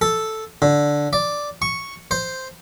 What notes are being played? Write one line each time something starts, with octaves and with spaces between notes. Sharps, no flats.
A4
D3
D5
C#6
C5